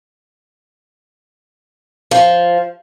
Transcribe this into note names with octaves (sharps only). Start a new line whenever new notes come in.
F3